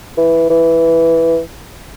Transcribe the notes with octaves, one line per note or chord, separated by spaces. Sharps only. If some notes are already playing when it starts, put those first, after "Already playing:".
E3
E3